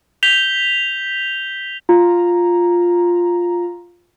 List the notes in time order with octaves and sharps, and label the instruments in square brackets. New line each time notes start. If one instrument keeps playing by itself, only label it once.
[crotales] G6 B6 F7 G7
[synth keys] F4 A#5